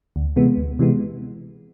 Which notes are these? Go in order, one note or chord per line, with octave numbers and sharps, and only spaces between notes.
D2
C3 E3 G#3 B3
D2
C3 E3 G#3 B3